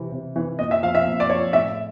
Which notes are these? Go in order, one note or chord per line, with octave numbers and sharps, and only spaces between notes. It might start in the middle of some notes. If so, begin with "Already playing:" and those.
Already playing: C3 E3
C3
E3
A#2 D#5
E5
F3 F5
E5
A#2
D5
F3 C#5
A2 E5